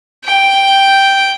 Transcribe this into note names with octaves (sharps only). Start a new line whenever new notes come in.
G5